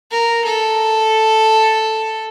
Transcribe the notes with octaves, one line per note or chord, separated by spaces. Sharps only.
A#4
A4